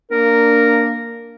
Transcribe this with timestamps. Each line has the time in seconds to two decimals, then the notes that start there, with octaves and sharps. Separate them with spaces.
0.11 A#3 D4 A#4